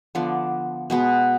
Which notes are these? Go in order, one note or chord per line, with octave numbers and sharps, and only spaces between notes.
D3 F3 B3 D5
B2 G#3 B3